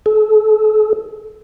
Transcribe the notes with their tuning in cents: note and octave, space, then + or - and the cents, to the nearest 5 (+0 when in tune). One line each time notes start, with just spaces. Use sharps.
A4 -40